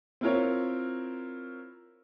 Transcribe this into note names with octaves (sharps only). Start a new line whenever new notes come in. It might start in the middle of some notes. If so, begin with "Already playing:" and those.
C4 E4 F4 A#4 C#5